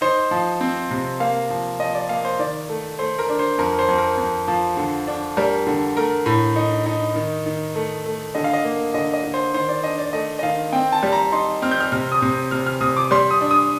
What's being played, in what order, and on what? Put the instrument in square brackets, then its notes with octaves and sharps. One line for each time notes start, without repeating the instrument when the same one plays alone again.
[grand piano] D#4 C5
F3
C4
C3
A#3 F5
F3
F3 D#5
D5
A#3 F5
C5
D#3 D5
A3
A3 C5
A#4
D4
C5
F2 A#4
C5
F2
A#4
F2
F3
D3
D4
G3 A#4
D3
A3 A#4
A2
D#4
D#4
D#3
D#3
A3
A3
D3 D#5
F5
D#5
A#3
D3 D#5
D#5
D3
C5
D#3 C5
D5
D4 D#5
D5
A3 D#5
D#5
D#3 F5
C4 G5
A5
G3
A#5
D#4 C6
C4 F6
G6
F6
C3 F6
D#6
C3
C3 F6
F6
C3 D#6
D6
G3 C6
D#6
D4
D#6